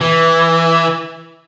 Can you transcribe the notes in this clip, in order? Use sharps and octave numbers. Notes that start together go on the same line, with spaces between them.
E3